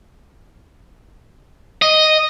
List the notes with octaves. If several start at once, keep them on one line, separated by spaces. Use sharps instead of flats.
D#5